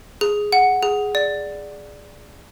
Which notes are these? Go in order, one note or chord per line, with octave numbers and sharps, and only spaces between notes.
G#4
F#5
G#4
D5